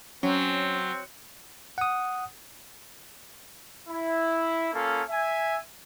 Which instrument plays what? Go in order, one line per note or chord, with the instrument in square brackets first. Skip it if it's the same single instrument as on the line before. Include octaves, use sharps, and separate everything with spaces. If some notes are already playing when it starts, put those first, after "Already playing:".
[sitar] F#3 [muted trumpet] C4 [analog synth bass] C#4
[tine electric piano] F#5 D#6
[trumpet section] E4
A#3 C#4 F4 A4
E5 G#5